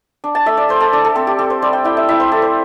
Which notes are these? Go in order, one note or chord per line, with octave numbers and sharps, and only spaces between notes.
D4
A5
A3 E5
D5
A3 C5
A4
D4 D5
A4
C4 A4
G4
C4 A4
C5
G3 D5
G5
E4 G5
E5
E4 E5
C5
E4 A4
C5